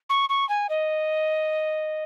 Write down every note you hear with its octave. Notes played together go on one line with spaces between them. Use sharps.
C#6
C#6
G#5
D#5